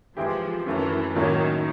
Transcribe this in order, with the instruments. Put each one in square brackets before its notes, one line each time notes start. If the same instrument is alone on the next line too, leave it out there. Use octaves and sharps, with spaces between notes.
[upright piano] E3 G#3 C4 E4 G4 [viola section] F3
[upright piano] F#2 D#3 F#3 A3 [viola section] E3
[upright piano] A2 F#3 A#3 C#4 E4 [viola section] D#3